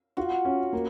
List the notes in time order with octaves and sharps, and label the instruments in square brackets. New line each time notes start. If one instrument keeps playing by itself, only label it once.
[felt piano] F4 [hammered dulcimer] F#4
[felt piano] C#4
A#3